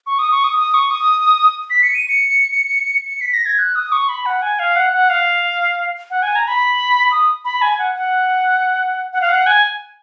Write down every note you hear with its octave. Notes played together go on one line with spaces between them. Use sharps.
C#6
D#6
C#6
D#6
D#6
C#6
D#6
B6
C#7
D#7
C#7
C#7
B6
A#6
G#6
F#6
D#6
C#6
B5
F#5
G#5
F5
F#5
F#5
F5
F#5
G#5
A#5
B5
D#6
B5
G#5
F#5
F#5
F#5
F5
F#5
G#5